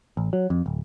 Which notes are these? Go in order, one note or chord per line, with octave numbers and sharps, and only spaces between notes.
A1
F#3
F2
D1